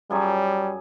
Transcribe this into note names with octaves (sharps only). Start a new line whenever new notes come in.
F#2 G3 G#4 C#6